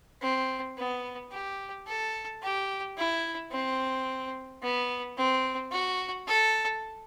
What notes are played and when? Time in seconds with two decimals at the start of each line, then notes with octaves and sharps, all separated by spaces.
0.22 C4
0.77 B3
1.32 G4
1.87 A4
2.43 G4
2.97 E4
3.52 C4
4.62 B3
5.17 C4
5.71 F#4
6.27 A4